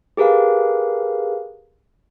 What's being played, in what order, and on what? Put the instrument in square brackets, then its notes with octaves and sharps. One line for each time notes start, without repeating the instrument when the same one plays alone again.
[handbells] G4 G#4 A#4 B4 F5